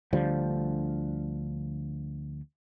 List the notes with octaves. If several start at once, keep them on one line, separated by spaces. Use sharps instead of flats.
D2 D3 F3 G3